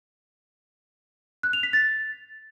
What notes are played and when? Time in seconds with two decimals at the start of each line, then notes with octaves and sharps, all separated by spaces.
1.43 F#6
1.53 F7
1.63 B6
1.73 A6